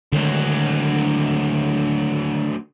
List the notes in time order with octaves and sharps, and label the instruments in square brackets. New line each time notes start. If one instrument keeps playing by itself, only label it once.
[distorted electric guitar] D2 F#3 [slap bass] D3 D#3 G#3